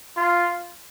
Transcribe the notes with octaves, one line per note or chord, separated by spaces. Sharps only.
F4